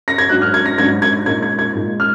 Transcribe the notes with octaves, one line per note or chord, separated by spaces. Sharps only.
A#6
G#6
G#2 F#3 D4 F#6
F6
G#6
A#6
G#2 F#3 D4 G#6
G#6
A#2 G#3 D#4 G#6
G#6
G#6
A#2 G#3 D#4
F6